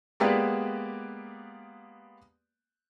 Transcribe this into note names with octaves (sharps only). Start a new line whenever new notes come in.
G#3 A#3 B3 G4 B4 D5